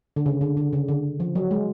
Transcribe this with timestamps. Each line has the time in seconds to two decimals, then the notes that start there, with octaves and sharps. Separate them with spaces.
0.16 D3
0.26 C#3
0.41 D3
0.57 D3
0.73 C#3
0.88 D3
1.20 F3
1.35 F#3
1.51 G#3